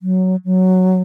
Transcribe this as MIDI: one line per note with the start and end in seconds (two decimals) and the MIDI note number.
0.01 0.36 54
0.45 1.02 54